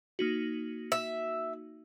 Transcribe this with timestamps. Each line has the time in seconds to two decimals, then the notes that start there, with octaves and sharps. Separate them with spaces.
0.19 A#3 D#4 F#4
0.92 E5